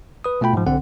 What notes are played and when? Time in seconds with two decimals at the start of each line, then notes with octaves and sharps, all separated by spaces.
0.24 B4 D#6
0.41 B2 A3 F4 G5 B5
0.53 G#2 F3
0.66 B1 D3 C4 F#5